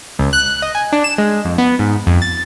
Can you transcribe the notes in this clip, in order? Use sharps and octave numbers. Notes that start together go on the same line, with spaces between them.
C#2
F#6
D#5
G#5
D4
E7
G#3
F2
B3
G#2
F2
A6